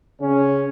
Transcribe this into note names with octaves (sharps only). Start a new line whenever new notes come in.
C#3 C#4